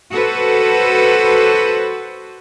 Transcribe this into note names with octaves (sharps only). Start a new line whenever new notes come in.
F#4 A4 B4 C5